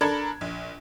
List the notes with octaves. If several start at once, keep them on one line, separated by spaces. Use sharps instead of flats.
D4 A4 A#4 B5 G#6
A#1